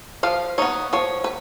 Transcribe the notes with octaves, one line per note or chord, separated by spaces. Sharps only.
F3 F5
B3 D#4 C#5
F3 C#5
B4